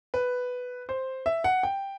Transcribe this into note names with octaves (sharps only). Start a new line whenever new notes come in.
B4
C5
E5
F#5
G5